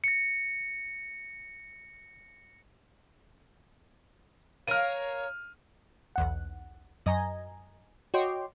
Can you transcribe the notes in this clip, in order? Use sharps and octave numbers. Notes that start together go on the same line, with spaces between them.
A#6 C#7
A#4 C#5 F5 F6 D#7
B1 E2 F#5
F#2 D#5 G#5 A#5
F#4 C#5 D#5 G5 C6 D6